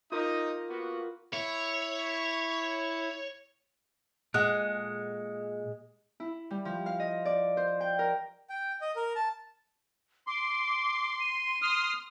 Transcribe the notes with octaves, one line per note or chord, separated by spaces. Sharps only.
D#4 F4 A#4 D6 D#6
A#3 B3 F#4
E4 C#5
A#2 G#3 A4 F#5 F#6
E4
G3
F3
F5
D#5
D5
C5
G5
A#4
G5
D#5
A#4
A5
C6 D6
D#7
C6 D#6 F6